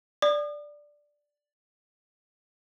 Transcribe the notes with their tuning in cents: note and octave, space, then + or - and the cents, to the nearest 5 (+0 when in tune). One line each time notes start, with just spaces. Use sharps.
D5 +0 D#6 -45